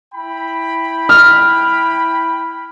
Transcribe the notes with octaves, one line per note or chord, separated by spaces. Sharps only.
E4 G5 B5
F6